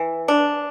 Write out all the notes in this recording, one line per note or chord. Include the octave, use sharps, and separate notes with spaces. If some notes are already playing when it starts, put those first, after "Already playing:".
Already playing: E3
D4